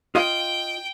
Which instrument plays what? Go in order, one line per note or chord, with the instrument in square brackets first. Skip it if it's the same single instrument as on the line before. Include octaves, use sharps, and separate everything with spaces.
[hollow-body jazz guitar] F4 D#5 F5 [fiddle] G5